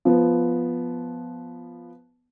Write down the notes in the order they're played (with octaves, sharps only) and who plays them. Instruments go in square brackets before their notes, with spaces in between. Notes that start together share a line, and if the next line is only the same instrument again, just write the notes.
[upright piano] F3 B3